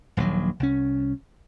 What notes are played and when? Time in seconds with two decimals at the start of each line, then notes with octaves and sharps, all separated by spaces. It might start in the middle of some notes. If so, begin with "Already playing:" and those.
0.17 D#1 A#1 D#2 F#3
0.60 C2 C#4